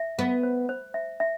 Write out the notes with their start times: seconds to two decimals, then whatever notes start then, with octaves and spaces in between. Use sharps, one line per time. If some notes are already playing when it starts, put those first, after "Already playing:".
Already playing: E5
0.19 B3 C5
0.43 C5
0.69 C5
0.94 E5
1.20 E5